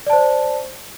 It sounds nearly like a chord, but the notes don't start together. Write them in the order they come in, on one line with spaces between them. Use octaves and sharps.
D5 A5 C5